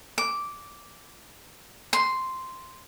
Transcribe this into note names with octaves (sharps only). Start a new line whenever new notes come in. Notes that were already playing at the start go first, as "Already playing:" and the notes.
D6
C6